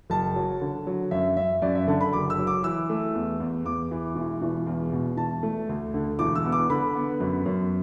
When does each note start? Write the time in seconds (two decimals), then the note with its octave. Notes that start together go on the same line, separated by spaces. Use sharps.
0.10 F#1 A5
0.36 F#3
0.61 D3
0.87 F#3
1.11 F#2 E5
1.36 F#2 E5
1.62 F#2 D5
1.75 E5
1.87 D3 A5
2.01 B5
2.13 F#1 D6
2.30 E6
2.38 F#3
2.47 D6
2.63 E3 E6
2.90 A3
3.15 E2
3.40 E2
3.65 E2 D6
3.91 E3
4.15 E1
4.41 E1
4.66 E2
4.92 B2
5.17 E1 A5
5.43 A3
5.69 D2
5.94 D3
6.19 E1 D6
6.35 E6
6.45 B3
6.52 D6
6.70 D3 B5
6.95 B3
7.20 F#2
7.46 F#2